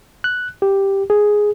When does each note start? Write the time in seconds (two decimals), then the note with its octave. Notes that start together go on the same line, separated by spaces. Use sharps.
0.24 F#6
0.62 G4
1.10 G#4